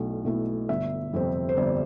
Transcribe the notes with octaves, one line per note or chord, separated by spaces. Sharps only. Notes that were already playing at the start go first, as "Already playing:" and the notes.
Already playing: B1 B2 A3 E4
B2 A3 E4
G1 E5
F2 C3 G3 C4
C5
G1 D5